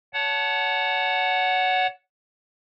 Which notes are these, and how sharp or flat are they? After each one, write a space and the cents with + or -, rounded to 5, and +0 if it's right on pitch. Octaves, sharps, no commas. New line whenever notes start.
C#5 +30 F#5 +0 A5 +0